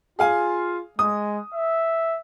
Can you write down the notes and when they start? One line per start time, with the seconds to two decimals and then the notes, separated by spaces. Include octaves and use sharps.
0.19 F4 G#4 F5 G#5
0.99 G#3 D#6
1.54 E5